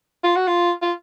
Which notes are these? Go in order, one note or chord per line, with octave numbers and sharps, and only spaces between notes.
F4
F#4
F4
F4